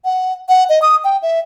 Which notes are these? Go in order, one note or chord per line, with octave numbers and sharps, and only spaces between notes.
F#5
F#5
D#5
D#6
G5
E5